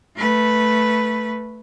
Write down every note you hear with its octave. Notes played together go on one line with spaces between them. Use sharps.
A3 B4